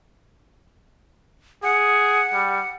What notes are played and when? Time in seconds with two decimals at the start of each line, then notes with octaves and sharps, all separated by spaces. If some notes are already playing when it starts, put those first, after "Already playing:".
1.63 G#4 F#5
2.33 G3